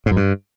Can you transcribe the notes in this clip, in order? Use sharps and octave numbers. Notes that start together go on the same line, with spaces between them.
G#2
F#2
G2